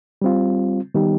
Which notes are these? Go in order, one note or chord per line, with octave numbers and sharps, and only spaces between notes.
G3 C4 F4
D#3 G3 B3 D#4 G4